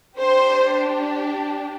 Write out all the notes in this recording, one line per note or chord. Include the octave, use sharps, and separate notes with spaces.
D4 G4 C5